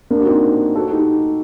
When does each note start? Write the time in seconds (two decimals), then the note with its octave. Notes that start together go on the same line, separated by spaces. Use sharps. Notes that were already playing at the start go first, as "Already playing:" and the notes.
0.10 A#3 D4
0.20 F#4
0.26 C4 D#4
0.75 F#4 A4
0.91 D#4 G4